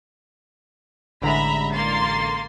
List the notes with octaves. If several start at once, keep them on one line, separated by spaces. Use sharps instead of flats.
A1 D3 G#3 E5 A#5 B5
A#3 C6 A6